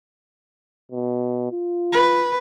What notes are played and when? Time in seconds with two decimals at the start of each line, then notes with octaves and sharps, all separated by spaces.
0.92 B2
1.52 F4
1.93 B4